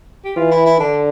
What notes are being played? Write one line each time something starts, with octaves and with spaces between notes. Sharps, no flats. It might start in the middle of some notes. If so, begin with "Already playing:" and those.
G4
E3 F4
E4
E4
D3 D4